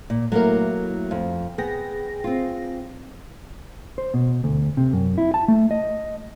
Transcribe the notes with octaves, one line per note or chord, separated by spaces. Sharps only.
A#2
F#3 A3 A#3 E4 A#4
F2
B3 G#4 G5 A#6
C4 F4
C5
B2
D2
C3
F#2
E4
A5
A3
D#5